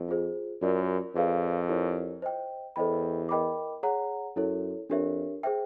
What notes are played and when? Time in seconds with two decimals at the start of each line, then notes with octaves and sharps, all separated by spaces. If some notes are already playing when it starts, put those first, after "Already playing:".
Already playing: F2
0.08 F4 G#4 C5
0.62 F#2 F4 A#4 D5
1.15 F2 G#4 B4 D5 F5
1.69 E4 G4 A#4 C#5
2.22 C5 D#5 G5
2.76 E2 A4 C5 D#5 G5 B5
3.29 A#4 D#5 G5 B5 D6
3.83 G#4 C#5 F#5 A#5
4.36 F#2 E4 A4 C#5
4.89 F2 D4 G4 A#4 C#5 E5
5.43 G#4 C5 E5 G5